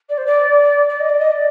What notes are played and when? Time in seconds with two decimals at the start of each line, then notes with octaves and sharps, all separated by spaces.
0.09 D5
0.17 C5
0.26 D5
0.89 D5
0.99 D#5
1.09 D5
1.19 D#5
1.31 D5